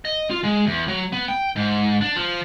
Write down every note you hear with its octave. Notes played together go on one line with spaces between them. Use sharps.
D#5
F4
G#3
E2
F#3
B3
G5
G#2
D4
F3